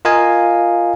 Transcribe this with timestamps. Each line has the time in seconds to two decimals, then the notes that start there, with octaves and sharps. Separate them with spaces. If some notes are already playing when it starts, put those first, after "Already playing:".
0.05 F4 A#4 D#5 F5 G#5